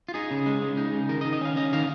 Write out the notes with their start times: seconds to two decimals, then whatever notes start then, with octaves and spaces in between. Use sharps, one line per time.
0.09 F4
0.14 D#4 G#4
0.31 C#3
0.46 G#3
0.62 C#3
0.77 D#4
0.93 C#3
1.09 D#3 A#4
1.21 D#5
1.25 D#3
1.33 D#5
1.41 C#4 F5
1.56 C#4 D#5
1.73 D#3 F5